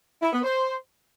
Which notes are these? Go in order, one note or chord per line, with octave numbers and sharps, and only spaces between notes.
E4
B3
C5